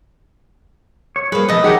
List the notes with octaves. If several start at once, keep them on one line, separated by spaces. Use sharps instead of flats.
C#5
G3 A#3 G#4 B4 C5
C3 F3 A3 G#4 B4 D#5
D#3 D#4 G4 G#4 C#5 E5 F#5